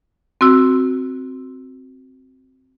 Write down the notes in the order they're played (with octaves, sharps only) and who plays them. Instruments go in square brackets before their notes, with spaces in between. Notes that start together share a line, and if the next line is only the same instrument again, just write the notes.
[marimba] C4 F#4 E6